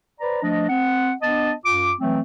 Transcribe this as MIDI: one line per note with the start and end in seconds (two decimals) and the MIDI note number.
0.21 0.39 71
0.21 0.39 72
0.21 0.39 74
0.21 0.39 82
0.42 0.68 53
0.42 0.68 57
0.42 0.68 62
0.42 0.68 75
0.69 1.12 60
0.69 1.12 78
1.22 1.51 59
1.22 1.51 62
1.22 1.51 75
1.22 1.51 81
1.65 1.91 42
1.65 1.91 65
1.65 1.91 86
1.99 2.20 52
1.99 2.20 54
1.99 2.20 57
1.99 2.20 60